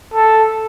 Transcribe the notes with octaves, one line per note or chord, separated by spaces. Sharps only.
A4